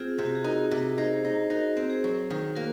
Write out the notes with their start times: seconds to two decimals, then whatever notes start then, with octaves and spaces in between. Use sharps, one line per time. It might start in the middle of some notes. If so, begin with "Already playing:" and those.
Already playing: C4 F4 G#4
0.19 C3
0.26 F#4
0.35 G#4
0.44 D#4 F#4 A#4
0.71 C3
0.97 D#4 G#4 C5
1.25 D#4
1.50 D#4 F#4 A#4
1.77 C4
1.90 G#4 C5
2.04 F#3
2.30 D#3
2.56 A#3 F#4 A#4